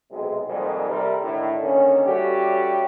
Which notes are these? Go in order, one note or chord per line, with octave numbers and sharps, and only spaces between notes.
B1 C3 G#3
F2 G#2 C3 D#3 G3 A#3
C3 G3 A4 A#4
A2 D3 D#3
D3 D#3 A#3 C#4
G3 A3 C#4 F#4 G4